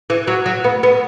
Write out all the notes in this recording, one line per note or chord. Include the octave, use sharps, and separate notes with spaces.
E3
F#3
F#3
B3
B3